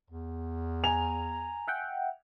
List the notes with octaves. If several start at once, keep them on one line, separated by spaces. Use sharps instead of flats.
E2
G#5 A#5 F7
E5 F#5 G5